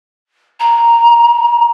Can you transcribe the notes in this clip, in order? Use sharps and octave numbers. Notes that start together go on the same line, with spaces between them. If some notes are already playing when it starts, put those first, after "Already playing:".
A#5